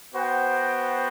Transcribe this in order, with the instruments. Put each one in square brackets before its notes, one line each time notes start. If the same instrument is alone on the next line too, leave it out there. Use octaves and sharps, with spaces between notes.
[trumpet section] B3 F#4 C5 G5